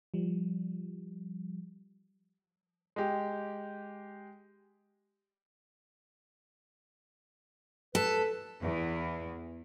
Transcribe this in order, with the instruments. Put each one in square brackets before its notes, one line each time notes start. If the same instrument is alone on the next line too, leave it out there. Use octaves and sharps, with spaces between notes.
[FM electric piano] F3 G3
[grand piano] G#3 G4
[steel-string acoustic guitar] A4 [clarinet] B4
[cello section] E2